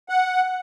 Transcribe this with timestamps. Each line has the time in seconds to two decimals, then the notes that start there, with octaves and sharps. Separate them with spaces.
0.09 F#5